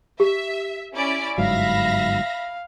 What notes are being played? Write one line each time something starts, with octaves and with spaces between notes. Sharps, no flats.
G4 E5
C#4 E4 D5
G1 G#2 F#3 E5 F5 B5 A#6